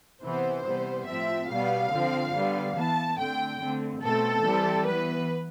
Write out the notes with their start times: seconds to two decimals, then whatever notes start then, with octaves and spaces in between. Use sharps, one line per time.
0.23 C3 E3 B3 C5
0.65 C3 E3 G3 B3
1.07 A2 F3 C4 E5
1.49 B2 G3 B3 F5
1.92 D3 F3 C4
2.34 D3 G3 B3
2.76 E3 B3 A5
3.18 D3 A3 C4 G5
3.60 D3 A3 C4
4.02 B2 A3 C4 A4
4.44 E3 G3 C4
4.86 E3 B3 B4